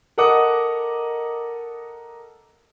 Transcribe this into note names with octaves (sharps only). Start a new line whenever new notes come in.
A4 A#4 D#5 F#5 D6 D#6